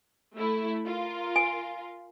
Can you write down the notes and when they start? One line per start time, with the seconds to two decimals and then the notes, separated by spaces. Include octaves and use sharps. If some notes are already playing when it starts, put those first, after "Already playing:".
0.36 A3 E4
0.87 F4 A#4
1.36 G#5